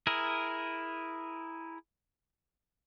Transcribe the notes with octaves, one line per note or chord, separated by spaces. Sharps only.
E4 G#4 A#4